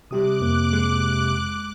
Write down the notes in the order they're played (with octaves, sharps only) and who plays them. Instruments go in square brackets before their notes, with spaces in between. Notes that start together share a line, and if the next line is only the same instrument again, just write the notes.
[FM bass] C3 [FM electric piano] G3 G4 D#6 [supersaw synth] D6 F#6
[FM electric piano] F2 A#3
[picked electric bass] G#3